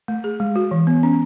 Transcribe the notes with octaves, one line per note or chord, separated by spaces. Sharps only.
A3
G#4
G#3
F#4
E3
B3
C#4